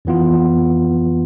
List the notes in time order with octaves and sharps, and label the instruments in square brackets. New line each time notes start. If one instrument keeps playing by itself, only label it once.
[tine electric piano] F2 E3 B3 F4